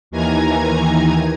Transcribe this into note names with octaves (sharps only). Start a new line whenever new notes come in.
D#2 D#3 E3 G#5 A#5 G#6